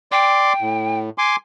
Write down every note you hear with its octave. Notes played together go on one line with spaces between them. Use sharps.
D5 G5 C6 D6
A2
G#5 C6 D6